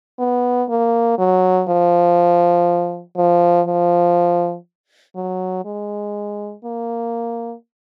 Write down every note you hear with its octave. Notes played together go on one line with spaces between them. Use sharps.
B3
A#3
F#3
F3
F3
F3
F#3
G#3
A#3